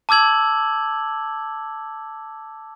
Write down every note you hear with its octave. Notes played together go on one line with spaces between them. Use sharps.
A5 D6 E6 G#6 F#7